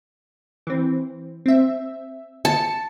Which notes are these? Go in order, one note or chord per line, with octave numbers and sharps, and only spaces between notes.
E3 C4
C4 E5
A5 C#7